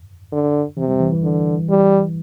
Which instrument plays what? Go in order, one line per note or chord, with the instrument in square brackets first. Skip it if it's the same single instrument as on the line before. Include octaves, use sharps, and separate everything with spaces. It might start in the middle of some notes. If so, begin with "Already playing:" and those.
[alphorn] D3
[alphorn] C3 [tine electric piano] E3
[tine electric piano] G3
E3
E3
[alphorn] D3
G3